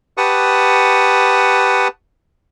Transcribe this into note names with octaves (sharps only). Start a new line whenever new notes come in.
G4 B4 F#5 A5 C#6 D#6